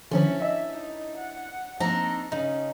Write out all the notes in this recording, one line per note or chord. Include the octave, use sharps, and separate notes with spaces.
D3 D#3 F3 C#4 D4 E4 B4
D#5 E5
D#4
F#5
F3 A#3 C4 D4 D#4 A4 A#5
C#3 C#4 D#4